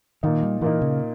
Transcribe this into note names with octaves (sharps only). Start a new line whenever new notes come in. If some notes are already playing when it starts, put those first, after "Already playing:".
A#2 D#3 A#3 D#4
G3
A#2 E3 A#3 D#4
C#3